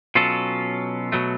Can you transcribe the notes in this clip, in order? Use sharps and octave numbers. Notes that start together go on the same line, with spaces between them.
B2 F#3 C#4 F4 A4
B2 F#3 A3